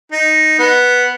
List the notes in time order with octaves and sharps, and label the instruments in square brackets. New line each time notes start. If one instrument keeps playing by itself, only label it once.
[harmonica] D#4
B3